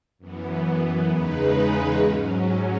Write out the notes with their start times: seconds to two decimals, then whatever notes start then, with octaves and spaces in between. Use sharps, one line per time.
0.18 F#2 E3 B3
1.08 E2 C#3 G#3 D#4 B4
1.53 B4
1.97 G#2 F#3 C#4 C#5